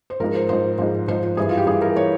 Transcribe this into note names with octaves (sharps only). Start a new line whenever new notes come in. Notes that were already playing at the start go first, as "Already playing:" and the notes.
C5
G#2 F3 A#4
C5
G#2 F3 C5
G#2 F3
G#2 F3 C5
C5
G2 E3 G#4
F4
G4
G2 E3 G#4
A#4
E3 C#5